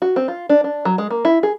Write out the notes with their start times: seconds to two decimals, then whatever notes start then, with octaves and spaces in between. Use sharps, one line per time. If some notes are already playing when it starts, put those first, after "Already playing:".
0.02 F#4
0.16 C4
0.28 F4
0.49 D4
0.64 D4
0.85 F#3
0.98 G#3
1.10 A#3
1.25 E4
1.43 G#4